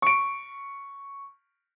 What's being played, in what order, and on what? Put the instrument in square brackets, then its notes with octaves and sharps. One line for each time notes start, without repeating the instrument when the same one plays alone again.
[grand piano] C#6 D7